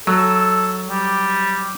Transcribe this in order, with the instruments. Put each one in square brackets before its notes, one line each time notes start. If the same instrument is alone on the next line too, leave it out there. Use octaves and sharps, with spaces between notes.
[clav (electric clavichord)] F#3 [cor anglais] A4
[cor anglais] G3